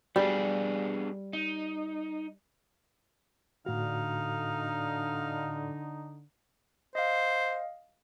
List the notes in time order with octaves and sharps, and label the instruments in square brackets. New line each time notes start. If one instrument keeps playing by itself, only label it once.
[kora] G3 [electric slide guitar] B3 D4 G#4
[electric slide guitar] D#4
[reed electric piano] A2 F#4 [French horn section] D3 [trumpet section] D#4 [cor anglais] F5
[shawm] C5 [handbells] D#5 F5